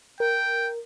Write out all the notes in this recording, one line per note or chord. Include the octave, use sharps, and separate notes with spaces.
A#4 G5